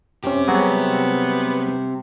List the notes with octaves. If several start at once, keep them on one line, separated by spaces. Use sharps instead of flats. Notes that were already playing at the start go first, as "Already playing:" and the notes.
F#2 C4 C#4 G4
F#3 G3 B3 F#4 G#4